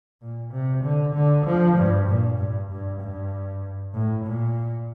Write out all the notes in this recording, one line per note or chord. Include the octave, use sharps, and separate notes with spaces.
A#2
C3
D3
D3
F3
G2
A#2
G2
G2
G2
A2
A#2